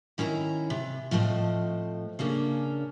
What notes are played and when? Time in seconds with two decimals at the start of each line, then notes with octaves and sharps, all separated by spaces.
0.18 D#3 C#4 E4 G#5 A#5
0.70 C3
1.11 A2 F3 A3 C4 D#5
2.19 C#3 A#3 C#4 D4